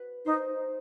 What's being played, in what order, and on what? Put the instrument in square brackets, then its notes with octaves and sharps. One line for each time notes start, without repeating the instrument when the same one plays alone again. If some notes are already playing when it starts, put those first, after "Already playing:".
Already playing: [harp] F#4 B4
[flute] D#4 [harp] C5